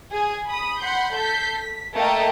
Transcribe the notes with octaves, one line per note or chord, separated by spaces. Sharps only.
G#4 G#5
B5 D#6
F#5 B5 C6 G6
A4 G6 B6 C7
B6
A3 A#3 A#4 D#5 G5 A5